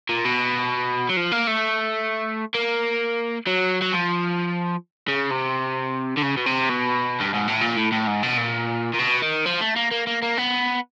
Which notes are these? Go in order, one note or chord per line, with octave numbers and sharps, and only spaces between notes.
A#2
B2
F#3
F3
A#3
A3
A#3
F#3
F#3
F3
C#3
C3
D3
C#3
B2
C3
B2
G2
G#2
A2
A#2
A2
A2
G#2
B2
A#2
A#2
B2
D#3
F3
A3
A#3
A#3
A#3
A#3
B3